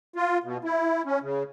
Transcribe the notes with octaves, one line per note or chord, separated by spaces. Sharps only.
F4
B2
E4
C#4
C#3